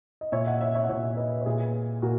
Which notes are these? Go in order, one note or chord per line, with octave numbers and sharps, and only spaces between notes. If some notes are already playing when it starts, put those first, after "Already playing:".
D#5
A#2 C#5 E5
D#5 F#5
C#5 E5
C#5 E5
F#5
A#2 C#5 E5
B4 D#5
C#5
A#2 G#4 B4
A#2 F#4 A#4